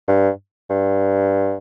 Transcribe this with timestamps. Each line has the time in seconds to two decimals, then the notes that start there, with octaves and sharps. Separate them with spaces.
0.08 G2
0.70 G2